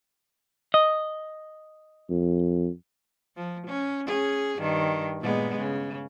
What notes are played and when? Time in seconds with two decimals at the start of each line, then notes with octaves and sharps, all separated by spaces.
0.74 D#5
2.10 F2
3.36 F3
3.67 C#4
4.06 C#4 G#4
4.58 G2 D#3
5.20 A#2 G#3 B3
5.58 C#3